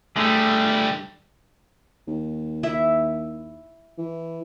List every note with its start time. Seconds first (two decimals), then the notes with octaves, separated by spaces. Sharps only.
0.16 D3 G3 A3 G#4
2.07 D#2
2.63 E4 E5
3.98 E3